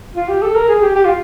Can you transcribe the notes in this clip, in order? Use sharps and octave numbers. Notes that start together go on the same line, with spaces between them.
F4
G4
A4
A#4
G#4
G4
G4
F4